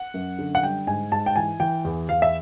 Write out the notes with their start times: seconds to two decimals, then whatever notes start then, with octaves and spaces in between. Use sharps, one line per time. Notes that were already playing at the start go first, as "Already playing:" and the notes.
Already playing: F#5
0.14 F#2
0.39 D3
0.55 F#5
0.63 G3 G5
0.87 G#2 G#5
1.12 G#2 A5
1.26 G5
1.36 E3 G#5
1.60 E3 G5
1.85 E2
2.09 E2 F5
2.22 E5